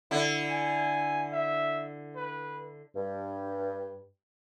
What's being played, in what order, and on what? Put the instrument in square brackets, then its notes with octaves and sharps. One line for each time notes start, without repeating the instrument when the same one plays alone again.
[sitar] D3 E4
[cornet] G#5
E5
B4
[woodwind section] G2